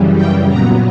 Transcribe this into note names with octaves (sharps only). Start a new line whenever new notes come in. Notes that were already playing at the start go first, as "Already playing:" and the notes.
Already playing: F#2 C#3 E3 G3
G5
A#2 F#3 B3 A#5